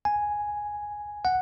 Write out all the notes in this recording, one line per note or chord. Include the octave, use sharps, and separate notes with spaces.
G#5
F#5